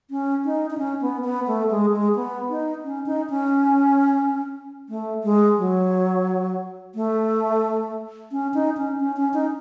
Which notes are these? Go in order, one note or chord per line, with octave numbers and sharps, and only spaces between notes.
C#4
D#4
D#4
C#4
B3
B3
A3
G#3
G#3
B3
D#4
C#4
D#4
C#4
A3
G#3
F#3
A3
C#4
D#4
C#4
C#4
C#4
D#4